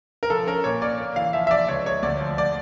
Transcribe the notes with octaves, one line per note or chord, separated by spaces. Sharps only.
A#4
F3 A4
C#4 A#4
A#2 C#5
A#3 D5
A#3
E3 F5
F3 E5
E5
F3 D5
C#2 C#5
C#2 C#5
D2 D5
F3
D5